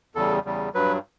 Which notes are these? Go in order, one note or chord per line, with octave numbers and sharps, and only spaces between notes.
E2 C#3 G3 A4
E2 C#3 G3
G2 F#3 B4